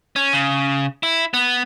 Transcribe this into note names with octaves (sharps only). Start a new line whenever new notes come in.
C#4
C#3
E4
B3